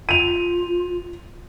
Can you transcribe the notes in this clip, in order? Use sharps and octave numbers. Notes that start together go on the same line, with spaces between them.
F4 D#7 F7